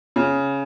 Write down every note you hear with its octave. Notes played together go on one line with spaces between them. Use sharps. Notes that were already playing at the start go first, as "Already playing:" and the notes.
C#3